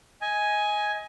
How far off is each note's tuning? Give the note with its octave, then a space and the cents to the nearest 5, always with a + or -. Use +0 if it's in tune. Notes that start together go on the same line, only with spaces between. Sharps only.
D#5 +25 G#5 +0